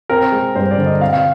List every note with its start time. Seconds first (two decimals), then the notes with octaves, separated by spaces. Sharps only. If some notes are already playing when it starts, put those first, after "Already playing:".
0.09 C4 A#4
0.32 G#3
0.55 G2 C5
0.71 D5
0.78 D3
0.86 D#5
1.01 C4 F5
1.13 F5